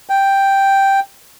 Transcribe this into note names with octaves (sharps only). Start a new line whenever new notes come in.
G5